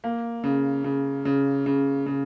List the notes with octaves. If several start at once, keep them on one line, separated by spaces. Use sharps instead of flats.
A#3
C#3
C#3
C#3
C#3
C#3